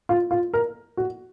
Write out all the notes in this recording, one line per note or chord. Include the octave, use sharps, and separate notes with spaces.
F4
F4
A#4
F#4